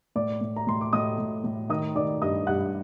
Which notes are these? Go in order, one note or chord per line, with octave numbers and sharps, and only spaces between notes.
A2 D5 D6
A2
A#5
A2 C6
D6
A2 D#5 D#6
A2
A2
D#3 D#5 D#6
D#3 D5 D6
G2 D#5 D#6
G2 F#5 F#6